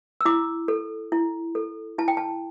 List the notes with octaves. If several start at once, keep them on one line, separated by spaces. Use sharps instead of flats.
E6
E4 D6
A4
E4
A4
E4 A5
G5
A5